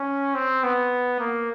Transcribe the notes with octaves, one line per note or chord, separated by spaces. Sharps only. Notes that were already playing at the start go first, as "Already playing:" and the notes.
Already playing: C#4
C4
B3
A#3